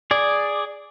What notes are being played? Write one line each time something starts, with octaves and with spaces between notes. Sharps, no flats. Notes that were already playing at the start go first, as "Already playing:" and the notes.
G#4 D5